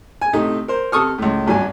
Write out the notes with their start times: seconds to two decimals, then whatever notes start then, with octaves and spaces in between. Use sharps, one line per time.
0.22 G#5
0.33 A2 C3 A3 D#4
0.68 A#4 C5
0.92 C3 A4 C#6 D#6 F6
1.18 C#2 A2
1.47 G#1 G2 F#3 G#5